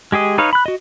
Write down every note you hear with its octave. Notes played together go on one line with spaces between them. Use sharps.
G#3 G4 G#4 D#5
D#4 B4 C#5 F5
B5 F#6
F#4 D#5